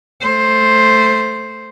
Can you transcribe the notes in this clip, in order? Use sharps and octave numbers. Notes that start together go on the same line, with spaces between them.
A3 C5